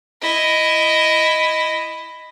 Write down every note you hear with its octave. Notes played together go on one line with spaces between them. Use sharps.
E4 D#5